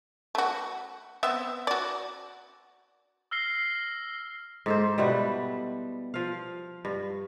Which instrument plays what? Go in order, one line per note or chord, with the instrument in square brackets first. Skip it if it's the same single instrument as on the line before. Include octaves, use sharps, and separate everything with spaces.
[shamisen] A3 F#4
B3 C4 E5
F#4 D5
[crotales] E6 F6 A#6 C7 G7
[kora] G#2 A4 C5
B2 G3 E4 F#5
F3 F5
G2